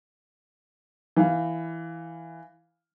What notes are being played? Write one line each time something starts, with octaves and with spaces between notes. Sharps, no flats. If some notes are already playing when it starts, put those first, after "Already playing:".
E3 F5